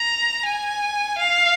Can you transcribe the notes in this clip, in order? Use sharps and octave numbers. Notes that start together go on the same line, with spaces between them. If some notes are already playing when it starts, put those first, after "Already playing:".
Already playing: A#5
G#5
F5